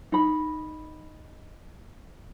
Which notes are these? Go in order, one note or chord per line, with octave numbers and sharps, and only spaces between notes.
D#4 B5